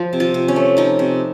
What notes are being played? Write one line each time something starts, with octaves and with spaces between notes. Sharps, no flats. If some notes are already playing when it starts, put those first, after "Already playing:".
Already playing: F3
C3
F4
C3
C#4
A3
F3 D#4
C3